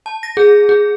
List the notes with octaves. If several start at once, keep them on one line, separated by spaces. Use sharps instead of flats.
A5
A#6
G#4
G#4